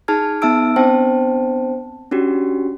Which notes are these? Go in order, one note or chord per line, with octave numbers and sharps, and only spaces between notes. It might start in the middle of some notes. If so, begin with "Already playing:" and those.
D#4 G#4 A5 F6 G#6
B3 D#4 E5 A5 E6 D7
B3 C4 D4 C5 G5 A5
C#4 D4 F#4 G4